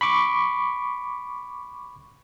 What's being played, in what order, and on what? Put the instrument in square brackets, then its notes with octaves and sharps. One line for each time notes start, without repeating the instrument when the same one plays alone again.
[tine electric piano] B5 C#6 D6